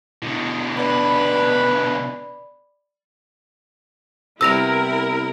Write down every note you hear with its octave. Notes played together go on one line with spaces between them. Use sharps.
B2 D3 E4
B3 D4 B4 D5 B5
C3 G3 B3 E4 A#4 E6 A#6 F7